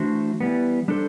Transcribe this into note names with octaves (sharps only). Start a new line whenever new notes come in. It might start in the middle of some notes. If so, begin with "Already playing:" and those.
Already playing: E3 A3 D4 F#4 C5
E3 G3 B3
G3 D4 A4 C5